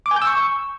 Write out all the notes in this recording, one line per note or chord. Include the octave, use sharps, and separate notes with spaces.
D6
G#5
G6
E6
C#6